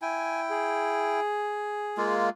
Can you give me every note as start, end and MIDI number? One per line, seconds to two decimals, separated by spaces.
0.02 1.20 64
0.02 1.20 79
0.02 0.40 80
0.50 2.15 68
1.97 2.29 56
1.97 2.29 58
1.97 2.29 65